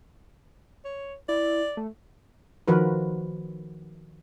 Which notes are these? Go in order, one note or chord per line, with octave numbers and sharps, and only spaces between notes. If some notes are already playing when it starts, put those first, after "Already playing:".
C#5
E4 D5
A3
D#3 F3 F#4 A#4 B4